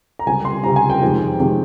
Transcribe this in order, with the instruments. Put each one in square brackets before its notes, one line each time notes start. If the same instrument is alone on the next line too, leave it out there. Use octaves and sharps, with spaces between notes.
[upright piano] A#5
C#2 C3 G3 G#5
C6
C#2 C3 G3 A#5
G#5
G5
F2 C3 D#3 G#3
F2 C3 D#3 G#3